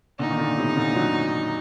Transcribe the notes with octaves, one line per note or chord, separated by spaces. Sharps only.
A#2 D3 D#4
D#3
A#2 D3
A2 C3
A#2 D3
D3 F#3